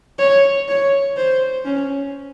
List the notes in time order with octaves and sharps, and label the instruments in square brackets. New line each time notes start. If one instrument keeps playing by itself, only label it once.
[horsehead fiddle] C#5
C#5
C5
C#4